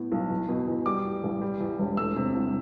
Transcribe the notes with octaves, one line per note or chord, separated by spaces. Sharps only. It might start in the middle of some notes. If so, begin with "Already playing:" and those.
Already playing: A2 B3
B1
E2
B2
E2
G3 D6
A2
A1
G3
E2
E1
A3 E6
C3
C2